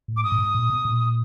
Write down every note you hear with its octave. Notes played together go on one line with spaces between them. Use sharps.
A2
D6
G#2 D#6
A2
G#2
A#2
B2
A#2